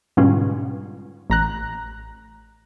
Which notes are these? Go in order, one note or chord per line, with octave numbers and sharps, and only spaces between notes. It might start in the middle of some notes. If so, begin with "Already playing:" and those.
G#2 B2 D3 G3 C#4 F4
A1 A#5 F#6